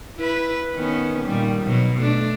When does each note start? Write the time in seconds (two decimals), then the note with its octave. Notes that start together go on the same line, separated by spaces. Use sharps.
0.17 E4 B4
0.74 D#3 B3 C#4
1.25 A#2 D#3 G3
1.63 B2 F#3
2.01 A3 D4